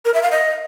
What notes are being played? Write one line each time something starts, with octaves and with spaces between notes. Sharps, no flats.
A#4
E5
F5
D#5